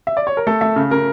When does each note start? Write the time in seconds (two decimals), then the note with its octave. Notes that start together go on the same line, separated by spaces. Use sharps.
0.07 E5
0.17 D5
0.27 C#5
0.37 A#4
0.47 A3 A4
0.61 A3 E5
0.76 C#3
0.91 C#3 A#4